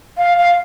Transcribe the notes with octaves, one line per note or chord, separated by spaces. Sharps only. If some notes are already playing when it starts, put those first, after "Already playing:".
F5
F5